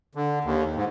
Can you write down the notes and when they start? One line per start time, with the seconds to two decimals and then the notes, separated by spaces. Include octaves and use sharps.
0.15 D3
0.44 D#2
0.75 G#2